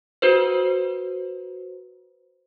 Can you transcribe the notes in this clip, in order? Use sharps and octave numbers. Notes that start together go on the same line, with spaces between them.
F#4 B4 C5